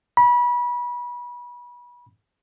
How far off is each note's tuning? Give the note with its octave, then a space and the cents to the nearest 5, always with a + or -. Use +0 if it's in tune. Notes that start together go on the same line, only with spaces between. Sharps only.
B5 -30